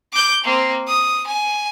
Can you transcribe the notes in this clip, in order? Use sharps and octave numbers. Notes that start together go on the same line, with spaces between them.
D6 G6
A#3 C4
D#6
G#5